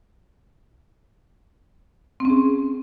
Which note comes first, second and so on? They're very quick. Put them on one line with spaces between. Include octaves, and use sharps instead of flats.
C4 C#4 G#4